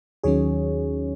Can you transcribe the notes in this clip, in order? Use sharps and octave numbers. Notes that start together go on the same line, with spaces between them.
D#2 D#3 F#3 C#4 G#4 C#5